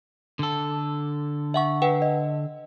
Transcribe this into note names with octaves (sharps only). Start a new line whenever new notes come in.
D3 A4
E5 F#5 C#6
B4 F#5 G5
D#5